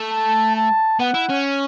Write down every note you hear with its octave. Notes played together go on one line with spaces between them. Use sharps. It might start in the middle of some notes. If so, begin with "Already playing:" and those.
Already playing: A3
A5
A5
B3 F#5
E4
C#4